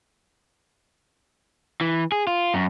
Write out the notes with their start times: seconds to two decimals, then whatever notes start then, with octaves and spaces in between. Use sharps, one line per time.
1.81 E3
2.12 G#4
2.27 F4
2.54 F#2